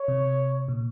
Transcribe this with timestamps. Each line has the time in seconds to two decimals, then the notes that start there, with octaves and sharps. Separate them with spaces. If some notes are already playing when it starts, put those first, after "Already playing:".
Already playing: C#5
0.08 C3
0.68 A#2